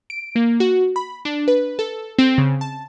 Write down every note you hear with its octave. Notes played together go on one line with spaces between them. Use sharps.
D7
A#3
F#4
B5
D4
B4
A4
C4
C#3
A5